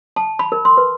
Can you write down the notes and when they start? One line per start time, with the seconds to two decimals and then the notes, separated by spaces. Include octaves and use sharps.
0.16 A5
0.39 B5
0.52 A#4
0.65 C6
0.77 B4